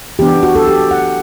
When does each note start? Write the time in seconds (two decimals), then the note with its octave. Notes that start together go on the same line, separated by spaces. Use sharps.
0.19 E3 B3 D4 G4
0.43 F#4
0.55 A4
0.67 G4
0.91 F#5